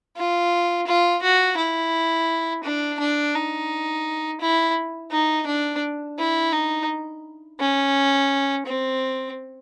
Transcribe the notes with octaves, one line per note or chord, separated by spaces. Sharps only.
F4
F4
F#4
E4
D4
D4
D#4
E4
D#4
D4
E4
D#4
C#4
C4